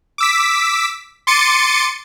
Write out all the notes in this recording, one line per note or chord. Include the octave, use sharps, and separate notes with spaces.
D6 E6 B6
C6 D6 A6 C#7 D#7